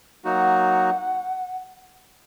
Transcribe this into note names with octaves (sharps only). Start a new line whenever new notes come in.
F#3 A#3 D#4 F#4 F#5